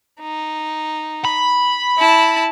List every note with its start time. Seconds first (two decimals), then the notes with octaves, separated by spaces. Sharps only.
0.21 D#4
1.25 B5
1.98 E4 A5